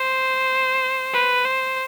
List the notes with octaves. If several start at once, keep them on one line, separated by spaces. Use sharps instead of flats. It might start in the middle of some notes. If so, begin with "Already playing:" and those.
Already playing: C5
B4
C5